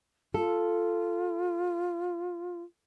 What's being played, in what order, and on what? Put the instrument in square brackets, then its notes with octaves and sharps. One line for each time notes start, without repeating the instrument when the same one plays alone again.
[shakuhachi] F4 [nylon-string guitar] A4